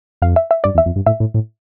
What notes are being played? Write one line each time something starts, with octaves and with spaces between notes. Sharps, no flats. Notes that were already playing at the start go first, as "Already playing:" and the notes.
F2 F5
E5
E5
G2 D5
E2
E5
F2
G2
A2 E5
A2
A2